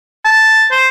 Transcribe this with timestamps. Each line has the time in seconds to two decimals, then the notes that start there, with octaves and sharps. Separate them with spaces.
0.25 A5
0.71 C5